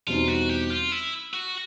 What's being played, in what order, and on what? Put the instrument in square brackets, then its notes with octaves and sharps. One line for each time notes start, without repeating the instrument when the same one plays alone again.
[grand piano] E2 B2 G3 C4 D#4 [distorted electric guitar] F4
[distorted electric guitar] F#4
G4
F4
E4
F#4